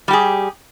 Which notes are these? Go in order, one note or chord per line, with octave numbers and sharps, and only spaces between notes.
G3 G4 G#4